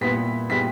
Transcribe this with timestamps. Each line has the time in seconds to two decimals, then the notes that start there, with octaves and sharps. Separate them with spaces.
0.01 A#2 G3 B3 E4 B6
0.50 A#2 G3 B3 E4 B6